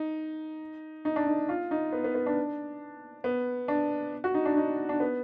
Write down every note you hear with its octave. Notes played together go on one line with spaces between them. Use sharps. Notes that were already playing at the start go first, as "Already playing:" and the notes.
Already playing: D#4
D#4
D4
D#4
F4
D#4
B3
B3
B3
D4
B3
D4
F#4
D#4
D4
D#4
D4
B3